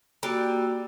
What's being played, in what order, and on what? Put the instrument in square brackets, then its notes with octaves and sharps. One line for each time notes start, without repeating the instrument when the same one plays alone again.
[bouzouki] G3 [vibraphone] A#3 F#4 E6